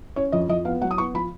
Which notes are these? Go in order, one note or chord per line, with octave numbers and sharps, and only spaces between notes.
C#4 C#5
F2 D#5
F2 D#5
B3 F5
F#3 F#5
D#6
B3 C#6
F3 B5